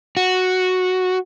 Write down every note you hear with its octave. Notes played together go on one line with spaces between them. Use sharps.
F#4